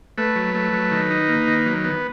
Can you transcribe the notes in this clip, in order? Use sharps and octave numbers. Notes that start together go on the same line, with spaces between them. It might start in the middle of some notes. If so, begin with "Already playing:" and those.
A3 B4
F#3
A3
F#3
D#3
D#4
A#3
D#3
F#3
B3